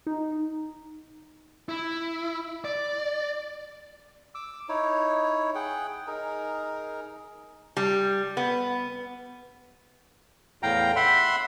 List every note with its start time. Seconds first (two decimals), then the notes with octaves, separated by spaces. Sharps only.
0.06 D#4
1.69 E4
2.65 D5
4.35 D6 E6
4.69 D#4 E4 C#5
5.55 G#4 F#5 G5
6.07 D#4 G#4 A#4
7.77 G3
8.37 B3
10.63 E2 A2 F5 G5 A#5
10.96 E5 F#5 B5 C6